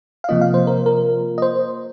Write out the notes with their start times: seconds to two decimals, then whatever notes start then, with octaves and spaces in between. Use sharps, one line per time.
0.24 F5
0.29 C3 F3 A#3 F4 D#5
0.41 F5
0.54 C5
0.67 A#4
0.86 A#4
1.38 D#5
1.42 C5